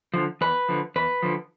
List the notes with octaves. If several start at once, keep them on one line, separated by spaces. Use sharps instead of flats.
D3 F3
E2 B4
D3 F3
E2 B4
D3 F3